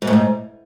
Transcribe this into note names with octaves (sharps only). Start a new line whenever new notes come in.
G#2
A2
G#2